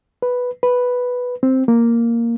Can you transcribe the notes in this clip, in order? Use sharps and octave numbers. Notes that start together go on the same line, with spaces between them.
B4
B4
C4
A#3